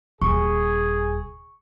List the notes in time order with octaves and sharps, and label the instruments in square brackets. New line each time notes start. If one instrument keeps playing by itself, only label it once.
[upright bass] D#1 [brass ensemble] G#4 [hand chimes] C#6